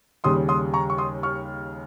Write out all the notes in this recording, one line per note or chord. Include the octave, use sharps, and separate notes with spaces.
D#2 C#3 G3 C6 D#6
C6 D#6
A#5 C#6
C#6
C6 D#6
C#6 F6